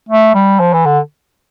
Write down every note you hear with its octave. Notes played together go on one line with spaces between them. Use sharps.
A3
G3
F3
E3
D3